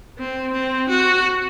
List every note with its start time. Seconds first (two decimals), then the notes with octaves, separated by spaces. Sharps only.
0.18 C4
0.53 C4
0.89 F#4